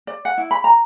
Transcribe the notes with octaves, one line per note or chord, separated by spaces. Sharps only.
D5
F#5
E4
B5
A#5